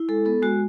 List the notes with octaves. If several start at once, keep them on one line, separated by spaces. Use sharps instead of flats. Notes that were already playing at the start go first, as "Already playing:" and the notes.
Already playing: E4
G#3 A4
B3 A4
G#3 F#4